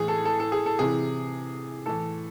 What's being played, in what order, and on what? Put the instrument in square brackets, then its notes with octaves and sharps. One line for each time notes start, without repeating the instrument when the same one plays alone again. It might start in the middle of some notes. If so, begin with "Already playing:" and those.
Already playing: [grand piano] A2 E3 G#4
A4
A4
A4
G#4
A4
C3 E3 G#4
A2 E3 A4